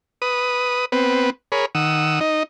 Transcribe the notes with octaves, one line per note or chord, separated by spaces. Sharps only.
B4 D#6
B3 C4 B4
G#4 A#4 C#5 B5
D#3 F#5 D#6 E6
D#4 D#5